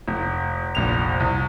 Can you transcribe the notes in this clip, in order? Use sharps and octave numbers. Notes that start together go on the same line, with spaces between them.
F1
F1 A#1 F7
C2